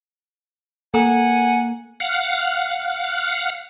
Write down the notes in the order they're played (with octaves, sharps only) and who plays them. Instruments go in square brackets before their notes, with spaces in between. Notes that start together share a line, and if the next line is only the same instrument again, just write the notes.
[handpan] A#3 [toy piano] A4 A#5 D#6 [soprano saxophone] F#5 [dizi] G#5
[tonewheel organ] F5 F#5